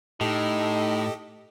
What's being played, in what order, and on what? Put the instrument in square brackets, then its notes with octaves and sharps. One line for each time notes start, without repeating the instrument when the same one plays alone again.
[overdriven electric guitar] A2 [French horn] D#4 [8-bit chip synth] G4 A4 D#5